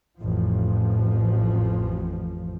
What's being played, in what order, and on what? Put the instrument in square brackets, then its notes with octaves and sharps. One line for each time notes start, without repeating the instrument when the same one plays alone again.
[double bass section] A1 F2 F3